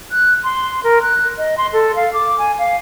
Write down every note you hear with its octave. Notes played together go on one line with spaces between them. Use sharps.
F#6
C6
A#4
F#6
D#5
C6
A4
F5
D6
G#5
F5